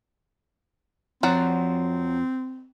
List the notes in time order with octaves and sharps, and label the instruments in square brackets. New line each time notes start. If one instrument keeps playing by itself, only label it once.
[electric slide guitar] F2 F3 [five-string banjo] F#3 D5 F#5 [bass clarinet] C4